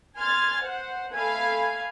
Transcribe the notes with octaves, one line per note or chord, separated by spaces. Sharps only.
G#5 C6 F6 G#6 A6
C5 F#5
A3 F5 G#5 B5 G#6